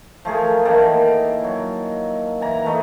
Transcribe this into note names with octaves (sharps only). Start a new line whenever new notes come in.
F3 A3 G#4 A#4
D#3 E3 A#3 A4
F#3
E3 A#5
E3 A3 D#5